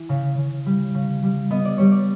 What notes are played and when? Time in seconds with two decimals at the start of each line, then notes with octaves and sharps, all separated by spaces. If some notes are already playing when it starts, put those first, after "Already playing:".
Already playing: E3
0.09 C#3
0.38 C#3
0.66 G3
0.94 C#3
1.23 G3
1.51 B3 D#5
1.65 D5
1.78 G3 C#5
1.91 D5